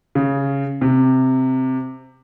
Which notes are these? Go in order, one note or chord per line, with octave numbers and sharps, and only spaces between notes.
C#3
C3